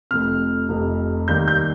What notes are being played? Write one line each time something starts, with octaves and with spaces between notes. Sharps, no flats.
F1 F2 C3 F6
F1 F2 C3
D#2 D#3 G3 G6
G6